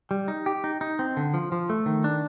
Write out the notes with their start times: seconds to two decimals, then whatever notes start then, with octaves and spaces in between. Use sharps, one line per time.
0.11 G3
0.28 D#4
0.46 G4
0.64 D#4
0.81 D#4
0.99 C4
1.17 D3
1.34 F3
1.52 F3
1.70 A3
1.86 D#3
2.04 D4